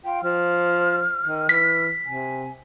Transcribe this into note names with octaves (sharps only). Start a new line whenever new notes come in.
F4 G5
F3 F6
D#3
E3 B6
C3 G#5